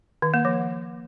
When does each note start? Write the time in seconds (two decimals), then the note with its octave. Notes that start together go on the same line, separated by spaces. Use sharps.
0.22 D#3
0.34 A#3
0.45 F3